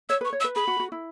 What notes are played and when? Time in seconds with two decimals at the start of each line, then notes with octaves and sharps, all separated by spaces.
0.09 C#5 E6
0.21 B4 C#6
0.33 C#5
0.40 E6
0.44 B4
0.56 G#4 B5
0.67 F#4
0.80 F#4
0.92 E4